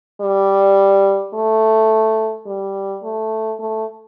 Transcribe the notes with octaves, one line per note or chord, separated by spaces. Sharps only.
G3
A3
G3
A3
A3